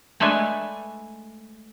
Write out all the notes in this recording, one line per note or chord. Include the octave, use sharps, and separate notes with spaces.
G#3 A3 D4 A4 B4 G#5